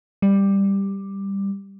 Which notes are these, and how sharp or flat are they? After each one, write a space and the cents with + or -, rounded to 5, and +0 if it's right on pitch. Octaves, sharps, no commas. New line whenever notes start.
G3 +10